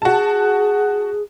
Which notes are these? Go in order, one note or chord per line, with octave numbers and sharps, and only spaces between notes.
F#4 G#4 A5